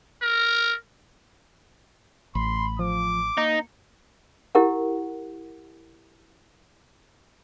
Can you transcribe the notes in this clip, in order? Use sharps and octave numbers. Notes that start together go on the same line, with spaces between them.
A#4
A1 B5 C6
F3 D6
A#3 D#4
E4 G4 A#4 F#5